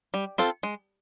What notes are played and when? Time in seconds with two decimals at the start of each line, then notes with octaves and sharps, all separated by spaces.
0.14 G3
0.38 C4 F4 A4
0.63 G#3